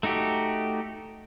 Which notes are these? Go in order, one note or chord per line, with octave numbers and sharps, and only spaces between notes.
A3 D#4 F#4 G4